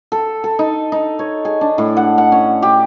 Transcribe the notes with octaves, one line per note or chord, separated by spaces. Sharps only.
A4
A4
D#4
D#4
C#5
G#4
D4
A2
F#5
F#5
C#4
G4